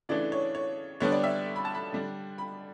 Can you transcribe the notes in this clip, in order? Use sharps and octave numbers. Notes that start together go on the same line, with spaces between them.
C#3 E3 A3 D4 D5
C#5
C#5
D3 G3 B3 D4 C#5
D5
E5
B5
A5
B5
D3 G3 D4
B5